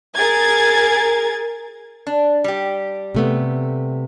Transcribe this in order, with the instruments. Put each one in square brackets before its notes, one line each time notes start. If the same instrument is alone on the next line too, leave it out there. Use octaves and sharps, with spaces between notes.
[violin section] G#4 A#4 G#6 A6
[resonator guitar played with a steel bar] D4
G3 G4
[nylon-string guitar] C3 A3 B3